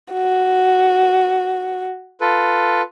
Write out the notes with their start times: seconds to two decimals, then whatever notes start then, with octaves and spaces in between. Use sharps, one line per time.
0.13 F#4
2.21 F4 A4 B4